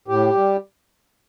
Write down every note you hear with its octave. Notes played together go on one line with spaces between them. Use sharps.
A2 G4
G3